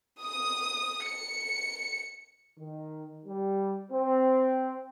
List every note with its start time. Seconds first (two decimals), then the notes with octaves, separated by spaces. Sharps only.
0.22 D#6
1.06 C#7
2.58 D#3
3.26 G3
3.91 C4